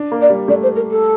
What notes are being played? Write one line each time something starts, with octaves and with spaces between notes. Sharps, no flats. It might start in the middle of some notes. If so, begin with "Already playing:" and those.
Already playing: D4
A#3
D5
G3
A3 D5
C5
A#4
A4